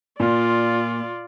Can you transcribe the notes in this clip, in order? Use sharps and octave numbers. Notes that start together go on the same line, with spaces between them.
A#2 F4 D5